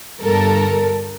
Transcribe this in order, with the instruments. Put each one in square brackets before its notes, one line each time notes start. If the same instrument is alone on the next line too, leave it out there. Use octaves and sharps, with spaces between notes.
[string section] G1 G2 A4 A#4